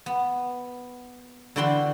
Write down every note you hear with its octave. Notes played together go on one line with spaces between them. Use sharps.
B3
D3 E3 F#4 G5 B5 C6